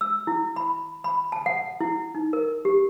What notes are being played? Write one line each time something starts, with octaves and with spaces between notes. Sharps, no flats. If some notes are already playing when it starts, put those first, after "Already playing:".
E6
E4
B5
B5
A5
F#5
E4
D#4
A#4
G4